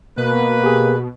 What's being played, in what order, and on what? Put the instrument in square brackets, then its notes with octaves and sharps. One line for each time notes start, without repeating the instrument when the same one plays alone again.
[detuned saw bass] B2 [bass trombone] A#3 [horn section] B4
[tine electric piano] G4 G#4